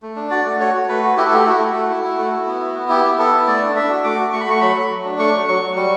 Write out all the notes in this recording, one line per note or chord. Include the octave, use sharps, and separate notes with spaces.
A3
D4
F#4 D5
A3
F#4 C#5
F#4
A3 B4
F#4
E4 G4
A4
A3 G4
E4 F#4
A3
A3
E4
E4
A3
E4
B3
E4
B3
E4 G4
B3
B3 A4
E4
A3 D5
D4
D4 E5
F#4
A3 D6
F#4
A3 C#6
B5
A3 C#6
F#3 B5
F#3
F#3
D4
A3 C#6
F#3
F#3 C#6
F#3
G3 C#6